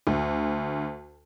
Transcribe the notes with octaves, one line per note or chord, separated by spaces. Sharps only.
D2